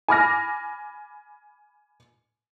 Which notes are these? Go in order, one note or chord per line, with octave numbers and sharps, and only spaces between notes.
G#5 B5 D6 F6 A#6